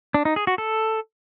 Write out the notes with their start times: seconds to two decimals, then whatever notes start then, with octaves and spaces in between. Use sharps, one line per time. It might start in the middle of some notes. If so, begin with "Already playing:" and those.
0.14 D4
0.25 D#4
0.36 G#4
0.47 F#4
0.58 A4